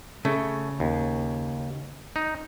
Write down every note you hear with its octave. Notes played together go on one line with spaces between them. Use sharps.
C#3 A3
D#2
D#4